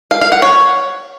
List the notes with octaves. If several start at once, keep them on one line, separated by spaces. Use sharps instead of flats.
F5
F5
F#5
C#5